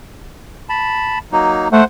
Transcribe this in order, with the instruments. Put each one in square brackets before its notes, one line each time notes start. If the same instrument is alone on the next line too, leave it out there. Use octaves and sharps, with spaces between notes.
[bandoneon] A5 B5
F#3 A#3 D#4
[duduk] A3 [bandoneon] C5 F#5